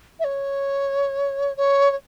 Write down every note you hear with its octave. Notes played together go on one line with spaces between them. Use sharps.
E5
C#5
C#5
C#5